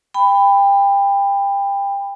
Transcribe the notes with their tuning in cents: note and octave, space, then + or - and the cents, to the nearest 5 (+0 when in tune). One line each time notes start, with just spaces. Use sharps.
G5 +25 B5 +15